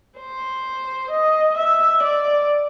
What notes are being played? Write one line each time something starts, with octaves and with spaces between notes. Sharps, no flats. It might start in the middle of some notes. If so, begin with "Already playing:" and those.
C5
D#5
E5
D5